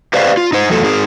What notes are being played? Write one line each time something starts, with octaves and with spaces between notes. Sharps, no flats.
G4 B4 C5 D5 E5 F5
F4
D#4 C5
E2 F#3 A3 A4
D#4 G#4 A#4